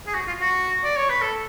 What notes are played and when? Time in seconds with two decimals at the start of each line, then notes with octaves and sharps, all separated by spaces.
0.07 G#4
0.14 F#4
0.27 F4
0.41 F#4
0.84 D5
0.97 C#5
1.09 B4
1.21 A4